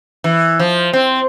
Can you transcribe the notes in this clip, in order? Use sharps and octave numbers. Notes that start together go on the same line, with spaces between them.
E3
F3
C4